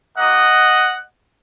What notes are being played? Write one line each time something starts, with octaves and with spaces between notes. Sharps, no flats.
A#3 D#4 F#4 D#5 F#5